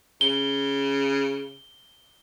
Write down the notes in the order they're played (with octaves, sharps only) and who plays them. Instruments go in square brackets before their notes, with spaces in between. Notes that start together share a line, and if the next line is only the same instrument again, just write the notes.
[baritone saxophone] C#3 [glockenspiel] G7